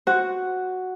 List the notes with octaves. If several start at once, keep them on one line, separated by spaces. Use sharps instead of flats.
F#4 C5 F#5